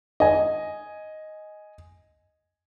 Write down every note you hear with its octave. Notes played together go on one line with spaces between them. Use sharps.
D#5 G#5